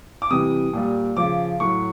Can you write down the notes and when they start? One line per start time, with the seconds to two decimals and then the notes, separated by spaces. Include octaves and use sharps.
0.22 D6
0.31 C3 E3 G3 D#6
0.73 A#2 G3
1.17 C#3 F3 D6
1.60 A2 F#3 C#6